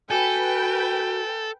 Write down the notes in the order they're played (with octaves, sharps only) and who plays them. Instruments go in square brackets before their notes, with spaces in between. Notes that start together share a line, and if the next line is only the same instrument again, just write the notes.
[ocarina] F#4 [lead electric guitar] A4 [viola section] B4 G5 [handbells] G#5